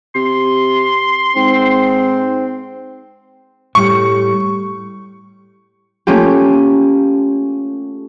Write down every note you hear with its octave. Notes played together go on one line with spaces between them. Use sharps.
C3 C6
G#2 C4
A2 G3 A3 C#6
A3 A#3 C#4 F4 G4